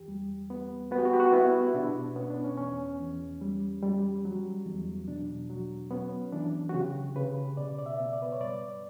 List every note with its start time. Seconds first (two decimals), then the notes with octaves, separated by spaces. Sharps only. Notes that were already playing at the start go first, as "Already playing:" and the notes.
Already playing: E2 G4
0.08 G3
0.50 B3
0.91 B3 F#4
0.98 G4
1.05 F#4
1.13 G4
1.20 F#4
1.32 B3 E4
1.67 E4
1.74 B2 D4
2.16 B3 C#4
2.30 D4
2.44 C#4
2.57 E2 C#4
3.00 E2
3.41 G3
3.82 G3
4.25 F#3
4.66 E2
5.08 B2 D4
5.50 F#3
5.91 B3 C#4
6.32 E3 D4
6.69 F#4
6.74 C#3 G4
7.16 C#3 B4
7.57 B2 D5
7.78 D5
7.86 E5
8.00 B3
8.13 D5
8.22 B4
8.32 C#5
8.40 G2 D5